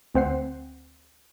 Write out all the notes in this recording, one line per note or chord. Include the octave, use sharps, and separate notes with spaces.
D2 C4 C5 F#5 C7